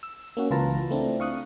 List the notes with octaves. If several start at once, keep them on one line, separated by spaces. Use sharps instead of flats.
E6
A#3 C#4 F#4
C#2 E3 F4 B4 A5 A#5
A3 C4 D4 E4
F5 C#6 D#6 F#6